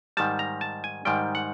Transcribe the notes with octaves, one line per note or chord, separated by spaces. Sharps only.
G#2 D#3 G3 A5
A#5
A5
G#5
G#2 D#3 G3 G5
F#5